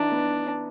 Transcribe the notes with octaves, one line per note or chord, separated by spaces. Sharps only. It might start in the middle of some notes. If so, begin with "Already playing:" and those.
Already playing: E3 D4 D#4
B3